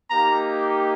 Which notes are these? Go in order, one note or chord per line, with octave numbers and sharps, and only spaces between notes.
A#3 D#4 G4 A#5